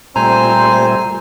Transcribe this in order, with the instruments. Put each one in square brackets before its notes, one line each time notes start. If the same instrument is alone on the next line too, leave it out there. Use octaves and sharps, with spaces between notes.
[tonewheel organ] A#2 G3 A3 [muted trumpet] C4 [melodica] C5 G#5 [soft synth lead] A#5